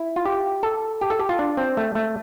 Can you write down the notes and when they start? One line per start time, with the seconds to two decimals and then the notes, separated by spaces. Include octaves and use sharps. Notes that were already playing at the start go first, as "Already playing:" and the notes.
Already playing: E4
0.16 F4
0.26 G4
0.63 A4
1.01 G4
1.10 A4
1.19 G4
1.29 F4
1.39 D4
1.57 C4
1.77 A3
1.95 A3